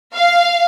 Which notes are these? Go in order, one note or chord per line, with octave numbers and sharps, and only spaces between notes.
F5